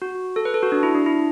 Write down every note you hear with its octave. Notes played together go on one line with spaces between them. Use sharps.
F#4
A4
B4
A4
F#4
D4
E4
D4
E4